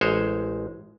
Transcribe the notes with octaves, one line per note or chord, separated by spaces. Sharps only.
A1 G#3 C5 C#5